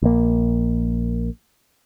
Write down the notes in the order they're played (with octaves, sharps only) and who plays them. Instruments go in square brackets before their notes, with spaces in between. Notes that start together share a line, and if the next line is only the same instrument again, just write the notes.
[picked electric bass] A#1 A#3